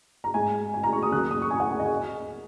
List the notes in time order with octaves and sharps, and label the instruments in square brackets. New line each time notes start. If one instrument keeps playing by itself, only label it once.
[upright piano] A#5
G#2 G#3 G#5
G#5
A#5
C#6
D#6
D#2 C#3 F#3 A#3 F#6
D#6
C#6
G#5
F#5
G#5
D#5
G#5